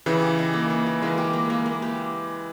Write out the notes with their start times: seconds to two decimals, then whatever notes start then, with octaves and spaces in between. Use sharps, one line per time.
0.06 C#3 E3 G4
0.22 G4
0.39 D#4
0.53 A#3
0.70 A#3
0.86 G4
1.02 E3 G#3 A#3
1.18 G4
1.33 A#3
1.50 A#3
1.66 A#3
1.82 G4